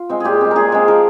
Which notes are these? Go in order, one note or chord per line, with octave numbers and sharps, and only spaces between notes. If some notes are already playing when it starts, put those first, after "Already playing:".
Already playing: F4
G#3 C4
A#2 G4 G#4
G#3 C4
A#2 G#4 A#4
G#3 C4
F3 A#4